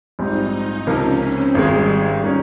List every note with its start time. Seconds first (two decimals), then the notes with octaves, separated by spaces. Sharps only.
0.19 A#1 G#2 G3 C4 D#4
0.87 C#2 C3 F3 A#3 C#4
1.21 C4
1.55 G#1 G#2 D#3 G3 G#3
2.24 D#3 A#3 C#4